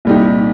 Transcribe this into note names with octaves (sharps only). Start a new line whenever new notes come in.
C2 A#2 G3 D#4 G4